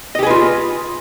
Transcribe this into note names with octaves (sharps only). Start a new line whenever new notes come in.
F4 G4 G#4 B4 D#5